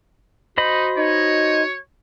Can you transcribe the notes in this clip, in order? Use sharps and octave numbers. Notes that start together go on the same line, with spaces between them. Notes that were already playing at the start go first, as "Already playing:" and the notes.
D#4 F#4 C5 D#5 B5
D#4 C#5